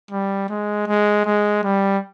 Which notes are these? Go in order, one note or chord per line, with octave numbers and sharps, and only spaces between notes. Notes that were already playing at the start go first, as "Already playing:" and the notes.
G3
G#3
G#3
G#3
G3